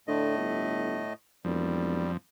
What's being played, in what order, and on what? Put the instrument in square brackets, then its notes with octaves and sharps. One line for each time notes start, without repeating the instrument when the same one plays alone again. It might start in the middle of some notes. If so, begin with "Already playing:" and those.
[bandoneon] A2 A3 D#5 [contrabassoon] D3
[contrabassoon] G1
[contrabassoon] E1 [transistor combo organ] F2 [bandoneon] G3